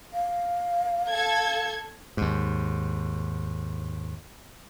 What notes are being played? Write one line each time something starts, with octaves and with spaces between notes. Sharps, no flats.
F5
A4 G#6
D#2 G#2